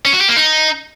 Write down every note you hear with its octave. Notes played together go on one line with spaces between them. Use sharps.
C#4
F#4
G4
A#3
D#4